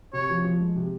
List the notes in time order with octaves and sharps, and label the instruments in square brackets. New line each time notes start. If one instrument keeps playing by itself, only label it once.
[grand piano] C3 [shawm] C#5
[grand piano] F3
F3
G#3
C3